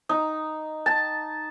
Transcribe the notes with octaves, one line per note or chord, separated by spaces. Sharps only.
D#4
A5